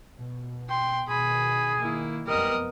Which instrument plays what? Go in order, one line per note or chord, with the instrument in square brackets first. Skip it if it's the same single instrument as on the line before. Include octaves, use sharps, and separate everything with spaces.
[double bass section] B2
[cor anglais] G5 [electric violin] C6
[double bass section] B2 D#3 [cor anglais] G#4 [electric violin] B5
[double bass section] D#3 [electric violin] A#3 E4
[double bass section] F1 F#2 B3 [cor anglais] G3 [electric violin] A#4 D#5